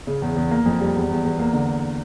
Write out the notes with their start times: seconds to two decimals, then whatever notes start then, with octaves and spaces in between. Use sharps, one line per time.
0.07 C#3
0.22 E2
0.37 E2
0.51 A#3
0.66 F2
0.81 G3
0.95 E2
1.09 E2
1.25 E2
1.39 A#3
1.53 D3